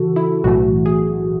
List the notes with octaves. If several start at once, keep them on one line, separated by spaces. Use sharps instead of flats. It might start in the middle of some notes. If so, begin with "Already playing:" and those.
Already playing: C#3 E3 F#4 A4
E4
B1 A2 E3 A3 F#4
G#4